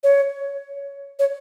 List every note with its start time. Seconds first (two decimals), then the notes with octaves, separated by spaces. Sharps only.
0.04 C#5
1.19 C#5